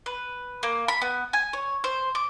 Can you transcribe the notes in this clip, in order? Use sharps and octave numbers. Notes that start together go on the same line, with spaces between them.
B4
A#3
B5
B3
G#5
C#5
C5
D6